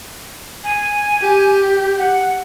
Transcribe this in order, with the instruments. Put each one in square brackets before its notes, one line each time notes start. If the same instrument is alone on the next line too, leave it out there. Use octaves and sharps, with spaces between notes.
[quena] G#5
[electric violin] G4
[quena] F#5